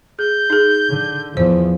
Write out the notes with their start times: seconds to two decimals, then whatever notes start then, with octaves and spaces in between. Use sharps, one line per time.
0.19 G#4 G6
0.50 D#4 G#4
0.90 D3
1.37 E2 F3 C5